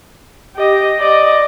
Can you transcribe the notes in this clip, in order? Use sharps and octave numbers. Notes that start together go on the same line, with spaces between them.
G4 D#5
D5 D#5